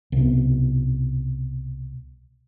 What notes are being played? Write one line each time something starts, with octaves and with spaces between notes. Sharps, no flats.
C2 B2